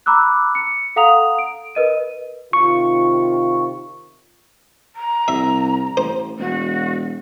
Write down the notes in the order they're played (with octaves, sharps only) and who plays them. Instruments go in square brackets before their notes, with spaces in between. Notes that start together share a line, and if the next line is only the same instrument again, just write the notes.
[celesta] A#5 B5 D6 E6 F#6
C#7
A4 F5 F#5 A#5 D#6 F7
D7
A#4 B4 D#5 D#7
[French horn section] C3 D#3 F4 [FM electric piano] C#6
[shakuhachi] A#5
[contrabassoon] C2 [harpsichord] E5
[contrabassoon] A1 [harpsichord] C5
[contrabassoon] E1 [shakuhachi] F#4